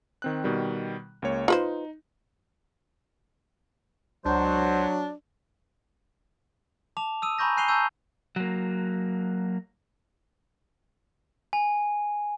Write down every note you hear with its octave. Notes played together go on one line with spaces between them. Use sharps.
D#3 C4 F#6
B2 D#3 G3
C#2 A#3 C#5
D#4 F4 B4 C5
C#2 F#3 D4 C5
A5 D6 F7
D#6 E6 D#7
G#5 A#5 B5 C#6 G6 A#6
G#5 F#6 C7 D#7 F7 G7
A5 A#5 C#6 E6 G6 D#7
F#3 A#3
G#5